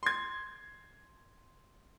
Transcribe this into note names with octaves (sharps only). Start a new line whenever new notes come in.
C6 G#6